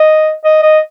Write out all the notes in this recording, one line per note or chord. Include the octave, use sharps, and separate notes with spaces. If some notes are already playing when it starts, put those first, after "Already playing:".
Already playing: D#5
D#5
D#5